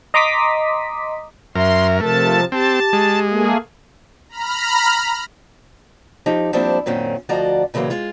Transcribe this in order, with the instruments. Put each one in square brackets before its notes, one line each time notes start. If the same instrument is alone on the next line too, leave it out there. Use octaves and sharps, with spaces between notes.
[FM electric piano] D#5 A#5 C6 D6 D#6 B6
[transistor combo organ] F#2 A#4 [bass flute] E5 [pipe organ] C6
[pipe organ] C3 F3 A5 [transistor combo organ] A3 [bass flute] A#4
[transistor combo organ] C4 [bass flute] G4 [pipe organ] A5
[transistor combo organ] G#3
[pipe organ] A3 A#3 G#4
[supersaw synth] A#5 B5 F6
[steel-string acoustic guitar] F3 D#4 G4
F3 G3 A#3 C4 D4 E4
F#2 A#2 D#3 C4 C#4
D2 F3 F#4 D5 D#5 A#5
A#2 C#3 E3 F#3 A#3
G#3 F4